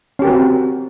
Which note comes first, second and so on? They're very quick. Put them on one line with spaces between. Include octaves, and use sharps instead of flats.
C#4 G4 A#4 F#4 C4